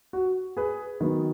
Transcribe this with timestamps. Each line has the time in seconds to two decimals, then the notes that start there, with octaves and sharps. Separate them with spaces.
0.13 F#4
0.57 G#4 B4
1.01 D#3 F#3 B3